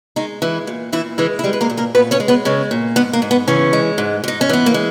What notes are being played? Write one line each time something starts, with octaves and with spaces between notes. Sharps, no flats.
D#3 G#3 D#4
E3 G#3 E4
A#2
A#2 E3 E4
E3 G#3 E4
E4
G3 G#3 G4
B4
A#3 A#4
A#2
A#3 A#4
A#2 B3 B4
C#4 C#5
G#3
B3 B4
C#3 G#3 C#4
A#2
G#2 B3
A#3
G#2
B3
C#3 E3 C#4
G#3
G#2
G#2 D#4
C#4
E3 B3
A#3
G#3